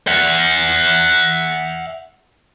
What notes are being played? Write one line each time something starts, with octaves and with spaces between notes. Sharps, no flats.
E5 F#5